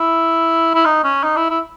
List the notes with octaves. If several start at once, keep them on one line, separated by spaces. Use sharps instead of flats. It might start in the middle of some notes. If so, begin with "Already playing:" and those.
Already playing: E4
E4
D#4
C#4
D#4
E4
E4